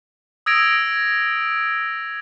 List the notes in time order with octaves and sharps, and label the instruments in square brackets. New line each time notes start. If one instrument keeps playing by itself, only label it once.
[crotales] D#6 E6 G#6 A#6 D7 F7